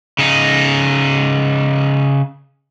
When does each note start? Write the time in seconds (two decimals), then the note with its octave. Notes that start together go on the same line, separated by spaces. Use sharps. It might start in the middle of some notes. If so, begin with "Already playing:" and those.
0.19 C#3 D#4